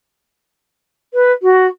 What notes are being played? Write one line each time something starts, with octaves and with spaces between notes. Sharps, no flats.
B4
F#4